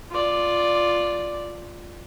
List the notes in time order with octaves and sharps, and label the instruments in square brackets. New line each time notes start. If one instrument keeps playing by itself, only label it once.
[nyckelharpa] F4 D5